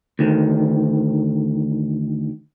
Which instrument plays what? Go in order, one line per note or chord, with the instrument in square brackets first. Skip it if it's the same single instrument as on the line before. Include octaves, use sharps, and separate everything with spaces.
[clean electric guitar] D2 D#3